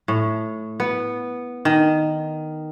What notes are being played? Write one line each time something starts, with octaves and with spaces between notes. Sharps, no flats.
A2
B3
D#3